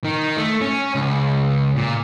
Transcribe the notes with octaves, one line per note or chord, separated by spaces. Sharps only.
D#3
A3
C#4
C#2
A#2